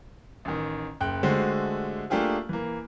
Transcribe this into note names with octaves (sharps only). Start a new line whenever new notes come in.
A1 D#3
F#1 G5 F#6
D3 G#3 A3 F#4 G4 C5
A3 A#3 D4 F4 G4 G#4
E3 A#3